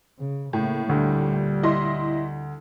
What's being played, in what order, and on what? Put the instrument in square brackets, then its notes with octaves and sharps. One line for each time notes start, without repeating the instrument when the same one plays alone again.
[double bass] C#3
[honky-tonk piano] A2 [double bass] C#3 A#3
[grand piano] D2 [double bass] A#2 G3
[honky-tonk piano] E4 D#5 C6